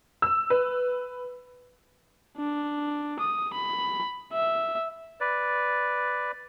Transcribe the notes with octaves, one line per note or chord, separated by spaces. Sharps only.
E6
B4
D4
D#6
B5
E5
B4 D5